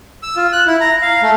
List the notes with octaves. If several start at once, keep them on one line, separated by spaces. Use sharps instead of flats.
E6
F4
F#6
E4
A#5
F5
A3